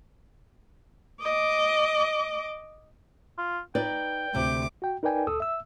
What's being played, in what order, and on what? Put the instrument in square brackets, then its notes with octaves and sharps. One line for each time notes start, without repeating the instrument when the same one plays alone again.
[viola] D#5 D6
[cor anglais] F4
[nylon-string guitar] D#4 B4 D5 [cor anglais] G5
[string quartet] D2 D6 [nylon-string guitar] C3
[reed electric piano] F#4 G5
D#4 A#4 B4 D5 G5 G#5
D2 A4 D#6 E6
E5 E6